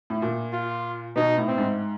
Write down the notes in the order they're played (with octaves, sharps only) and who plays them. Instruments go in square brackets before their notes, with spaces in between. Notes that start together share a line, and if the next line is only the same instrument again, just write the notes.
[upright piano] A2
A#2
[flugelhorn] F4
[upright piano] B2 [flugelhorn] D#4
[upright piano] A2
[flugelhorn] C4
[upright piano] G#2